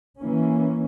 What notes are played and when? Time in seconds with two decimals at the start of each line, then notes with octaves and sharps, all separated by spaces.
0.18 E3 A#3 C#4